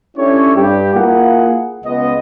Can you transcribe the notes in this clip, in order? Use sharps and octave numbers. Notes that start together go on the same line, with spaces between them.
C#4 D4 E4 G4 A4 C#5
G2 G4
A#3 E4 F4 G#4 F#5
C#2 B3 D#5